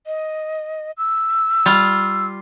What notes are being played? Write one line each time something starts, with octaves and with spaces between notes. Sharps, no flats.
D#5
E6
G3 F4